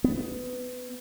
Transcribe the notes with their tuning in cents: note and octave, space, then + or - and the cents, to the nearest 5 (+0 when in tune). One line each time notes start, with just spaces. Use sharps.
B3 +20